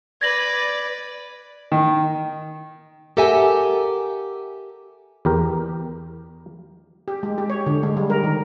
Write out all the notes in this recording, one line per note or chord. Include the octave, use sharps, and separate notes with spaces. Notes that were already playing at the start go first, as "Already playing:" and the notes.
B4 D5 G#6 A#6 F#7
D#3
G4 A4 A#4 E5 F#5 G#5
E2 G4 A#4
G4
G#3
G4
C#5
D3
G#3
G3
A#4
D#3